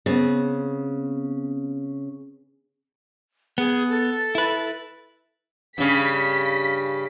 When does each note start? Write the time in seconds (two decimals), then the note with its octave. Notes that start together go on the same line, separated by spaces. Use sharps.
0.06 C#3 B3 C4
3.58 B3 G#4
3.90 A4
4.35 E4 B4
5.78 G2 C#3 B6